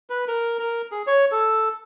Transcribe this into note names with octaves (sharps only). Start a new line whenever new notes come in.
B4
A#4
A#4
G#4
C#5
A4